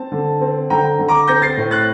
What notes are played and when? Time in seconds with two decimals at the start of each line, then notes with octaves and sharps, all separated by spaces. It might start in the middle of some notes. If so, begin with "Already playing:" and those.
Already playing: C4 A5
0.12 D3
0.41 C4
0.70 D3 G5 A#5
0.99 D3
1.08 A#5 D6
1.28 C4 G6 A#6
1.42 A6 C7
1.57 A2
1.71 F#6 A6